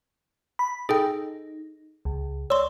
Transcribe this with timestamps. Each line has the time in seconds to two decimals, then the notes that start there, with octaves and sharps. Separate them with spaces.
0.59 B5
0.89 D#4 G#4 A4 G5
2.05 C#2
2.50 C#5 D5 C6 E6